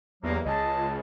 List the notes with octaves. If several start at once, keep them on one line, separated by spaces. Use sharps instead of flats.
E2 G2 F#3 A#3
C#2 G#4 D#5 A5